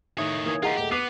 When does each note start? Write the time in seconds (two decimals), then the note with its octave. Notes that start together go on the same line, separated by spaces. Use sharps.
0.18 A2 D#3 D#4 C#5 E5 D#6
0.46 E3 A#3 D#4 D#6 G#6
0.63 F4 G4 G#4 D#5 F#5 A#5
0.77 D#1 A3 G4
0.92 B3 B4 D6 B6 C7 D#7 F7